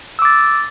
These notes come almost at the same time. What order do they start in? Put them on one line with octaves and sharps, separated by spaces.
E6 D6 A6